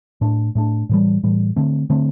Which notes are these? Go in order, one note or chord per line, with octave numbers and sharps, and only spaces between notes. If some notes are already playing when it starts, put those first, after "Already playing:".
A2 A3 D4
A2 A3 D4
A2 E3 G3
A2 E3 G3
D3 A3 C4
D3 A3 C4